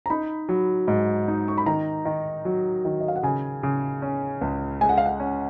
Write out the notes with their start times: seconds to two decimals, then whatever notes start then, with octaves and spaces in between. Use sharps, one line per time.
0.06 A#5
0.10 D#4 B5
0.49 F#3
0.88 G#2
1.28 D#4
1.48 C#6
1.58 B5
1.66 D#3 A#5
2.05 D#3
2.45 F#3
2.85 D#3
3.01 D#5
3.08 F5
3.16 F#5
3.23 C#3 G#5
3.63 C#3
4.02 C#4
4.41 C#2
4.81 G#3 G#5
4.89 F#5
4.98 F5
5.06 F#5
5.20 C#4